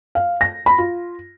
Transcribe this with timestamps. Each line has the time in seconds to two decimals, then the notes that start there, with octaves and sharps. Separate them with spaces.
0.15 F5
0.41 A#6
0.66 B5
0.78 F4